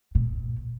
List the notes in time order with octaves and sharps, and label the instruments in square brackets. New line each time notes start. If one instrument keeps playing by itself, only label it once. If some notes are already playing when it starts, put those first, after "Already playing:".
[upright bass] A#2